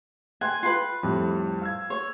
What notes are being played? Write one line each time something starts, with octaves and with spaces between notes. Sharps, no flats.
G5 G#5 C6 F#6
F4 B4
F2 A2 G3
F5 E6 G#6
C#5